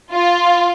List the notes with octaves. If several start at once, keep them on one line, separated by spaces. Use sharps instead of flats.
F4